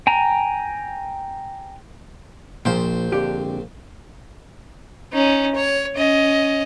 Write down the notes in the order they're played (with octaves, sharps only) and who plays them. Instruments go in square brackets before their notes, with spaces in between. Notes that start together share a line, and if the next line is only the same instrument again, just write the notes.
[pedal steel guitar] G5 G#5 A#5
[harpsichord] A#1 C5 G5 [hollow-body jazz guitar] A#2 F3
[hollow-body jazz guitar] F2 D3 G4
[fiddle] C#4 D#4
C#5
C#4 D#5